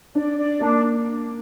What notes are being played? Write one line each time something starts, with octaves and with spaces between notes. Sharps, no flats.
D4 D5
D5
A#3 D4